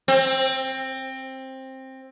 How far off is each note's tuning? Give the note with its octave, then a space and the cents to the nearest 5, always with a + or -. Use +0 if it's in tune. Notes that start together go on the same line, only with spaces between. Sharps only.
C4 +15